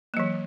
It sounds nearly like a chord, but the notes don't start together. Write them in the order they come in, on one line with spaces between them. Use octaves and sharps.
A#3 F#3 E3